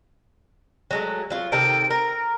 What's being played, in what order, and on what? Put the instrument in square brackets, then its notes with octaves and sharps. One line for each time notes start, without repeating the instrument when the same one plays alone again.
[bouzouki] F#3 G#3 A3
F#3 F4
[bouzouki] C3 D#3 A4 [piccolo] D7
[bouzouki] A#4 [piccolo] A#6